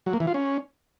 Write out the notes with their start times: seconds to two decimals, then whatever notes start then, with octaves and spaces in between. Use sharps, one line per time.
0.06 F#3
0.13 A#3
0.20 E3
0.27 F4
0.34 C#4